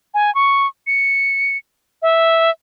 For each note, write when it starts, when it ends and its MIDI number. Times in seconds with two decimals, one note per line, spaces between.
0.14 0.33 80
0.35 0.67 85
0.87 1.57 97
2.02 2.50 76